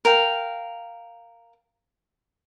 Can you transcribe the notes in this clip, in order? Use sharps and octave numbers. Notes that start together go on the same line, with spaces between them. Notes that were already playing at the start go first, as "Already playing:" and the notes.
A#4 F5 G5